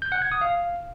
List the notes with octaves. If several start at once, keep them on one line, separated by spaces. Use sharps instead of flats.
G6
F#5
G#6
D#6
F5